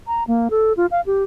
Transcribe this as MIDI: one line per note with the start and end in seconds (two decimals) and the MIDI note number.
0.07 0.24 82
0.27 0.48 58
0.50 0.73 69
0.77 0.86 65
0.91 1.01 77
1.06 1.23 67